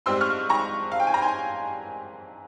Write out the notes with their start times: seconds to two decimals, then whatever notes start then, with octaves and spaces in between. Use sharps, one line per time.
0.06 G#2 G3 C4 C6 E6
0.21 C#6 F6
0.49 A#5 C#6
0.92 F5
1.00 G5
1.07 G#5
1.14 A#5
1.22 G#5 C6